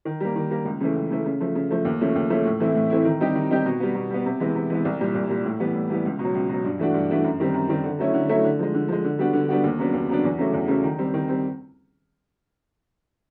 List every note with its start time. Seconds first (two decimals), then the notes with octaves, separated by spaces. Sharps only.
0.05 D#3
0.20 G3 A#3
0.36 D#3
0.51 G3 A#3
0.65 C#2
0.81 C#3 E3 A3
0.96 C#2
1.10 C#3 E3 A3
1.26 C#3
1.41 F3 A3
1.55 C#3
1.71 F3 A3
1.85 D#2
2.00 C#3 F3 A3 C#4
2.15 D#2
2.30 C#3 F3 A3 C#4
2.45 A2
2.60 E3 A3 C4 E4
2.75 A2
2.90 E3 A3 C4 E4
3.05 D#3
3.20 G3 C4 D#4 G4
3.35 D#3
3.51 G3 C4 D#4 G4
3.66 B2
3.80 G3 B3
3.95 B2
4.10 G3 B3
4.25 C3
4.40 E3 G#3 B3
4.55 C3
4.70 E3 G#3 B3
4.85 C2
5.00 A#2 G3
5.15 C2
5.30 A#2 G3
5.45 A2
5.60 E3 G3 B3
5.74 A2
5.90 E3 G3 B3
6.05 C#2
6.19 B2
6.24 F#3
6.34 C#2
6.49 B2 F#3
6.64 G2
6.79 E3 A3 D4 F#4
6.94 G2
7.09 E3 A3 D4 F#4
7.24 F#2
7.40 D#3 G3 C4
7.54 F#2
7.69 D#3 G3 C4
7.84 D3
7.99 F#3 A3 C#4 E4
8.14 D3
8.29 F#3 A3 C#4 E4
8.44 D3
8.59 F3 G#3
8.74 D3
8.88 F3 G#3
9.04 D3
9.19 G3 B3 D4 F#4
9.33 D3
9.49 G3 B3 D4 F#4
9.64 D#2
9.79 C#3 F#3 B3 D4
9.93 D#2
10.08 C#3 F#3 B3 D4
10.24 E2
10.38 C#3 F#3 A3
10.53 E2
10.68 C#3 F#3 A3
10.83 D#3
10.99 G3 C4
11.14 D#3
11.28 G3 C4